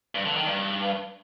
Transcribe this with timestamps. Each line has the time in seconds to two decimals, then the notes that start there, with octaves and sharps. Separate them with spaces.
0.15 G2
0.25 D3
0.36 D#3
0.47 G2